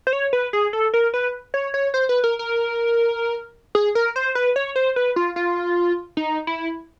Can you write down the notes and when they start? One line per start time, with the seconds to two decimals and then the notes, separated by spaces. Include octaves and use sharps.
0.07 C5
0.13 C#5
0.33 B4
0.53 G#4
0.73 A4
0.94 A#4
1.14 B4
1.54 C#5
1.74 C#5
1.94 C5
2.09 B4
2.24 A#4
2.39 A#4
3.75 G#4
3.95 A#4
4.16 C5
4.35 B4
4.56 C#5
4.76 C5
4.96 B4
5.16 F4
5.36 F4
6.17 D#4
6.47 E4